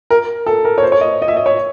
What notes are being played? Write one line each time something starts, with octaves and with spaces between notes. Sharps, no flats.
A#4
A4
A#4
C#5
C5
C#5
D#5
D#5
E5
D#5
C#5